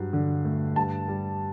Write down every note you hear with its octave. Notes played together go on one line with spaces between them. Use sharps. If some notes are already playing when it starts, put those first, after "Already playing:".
Already playing: G2 F#3
D3
A3
G2 A5
G3